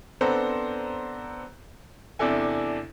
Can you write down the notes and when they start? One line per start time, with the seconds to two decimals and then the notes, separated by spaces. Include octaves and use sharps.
0.21 B3 C4 D4 A4 C5 A#5
2.19 E2 C3 D4 E4 A4 G#5